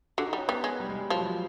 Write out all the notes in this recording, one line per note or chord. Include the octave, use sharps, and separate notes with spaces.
D3 F#4
D#4
G3
C#4
G3 B3
G#3
G3
G#3
G3
F3 F#3
F3